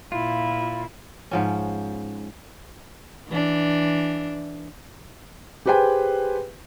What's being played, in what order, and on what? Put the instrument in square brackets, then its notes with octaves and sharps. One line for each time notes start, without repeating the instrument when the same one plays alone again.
[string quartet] A#2 E4 [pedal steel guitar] F4
[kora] G#2 F3 C#4
[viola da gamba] E3 D4
[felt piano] G4 G#4 B4 C5 G5 G#5